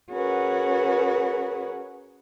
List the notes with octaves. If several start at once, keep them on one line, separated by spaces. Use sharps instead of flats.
C#4 F#4 G#4 A#4 B4